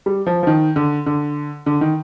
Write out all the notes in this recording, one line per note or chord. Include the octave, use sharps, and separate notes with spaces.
G3
F3
F3
D#3
D3
D3
D3
D#3